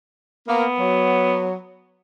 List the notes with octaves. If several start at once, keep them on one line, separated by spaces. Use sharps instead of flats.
A#3 B3
F#3